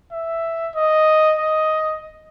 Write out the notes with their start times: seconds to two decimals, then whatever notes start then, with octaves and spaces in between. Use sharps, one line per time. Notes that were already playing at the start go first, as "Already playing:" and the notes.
0.12 E5
0.75 D#5
1.39 D#5